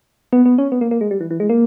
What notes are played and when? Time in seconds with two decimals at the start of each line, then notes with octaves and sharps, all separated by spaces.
0.33 B3
0.45 B3
0.58 C#4
0.72 B3
0.81 A#3
0.91 A#3
1.01 G#3
1.11 G3
1.21 E3
1.31 E3
1.40 G#3
1.49 A#3